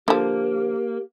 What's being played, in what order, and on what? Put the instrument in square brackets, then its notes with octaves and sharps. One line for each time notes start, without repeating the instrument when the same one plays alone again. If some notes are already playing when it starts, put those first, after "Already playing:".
[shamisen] D3 F3 [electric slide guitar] A#3 [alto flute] G4